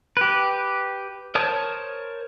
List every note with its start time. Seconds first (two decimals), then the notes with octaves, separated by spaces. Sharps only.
0.17 G4 B4
1.35 A#4 C5 C#5 A5 D#6